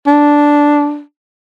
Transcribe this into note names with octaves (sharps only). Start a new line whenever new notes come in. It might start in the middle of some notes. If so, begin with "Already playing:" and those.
D4